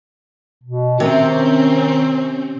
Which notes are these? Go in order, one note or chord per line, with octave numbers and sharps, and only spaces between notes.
B2
C3 D#3 C4 C#4